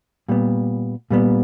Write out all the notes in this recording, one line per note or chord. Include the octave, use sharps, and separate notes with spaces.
A#2 G3 B3
A#2 G3 B3